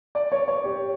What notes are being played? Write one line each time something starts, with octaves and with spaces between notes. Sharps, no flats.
D5
C#5
C#5
G4